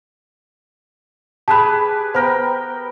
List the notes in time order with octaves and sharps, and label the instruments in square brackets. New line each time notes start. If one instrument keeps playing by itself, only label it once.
[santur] G4 G#4 B4 [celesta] A5 B5
[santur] B3 A#4 G5 [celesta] C5